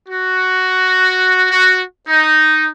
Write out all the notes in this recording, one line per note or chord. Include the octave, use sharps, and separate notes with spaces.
F#4
F#4
D#4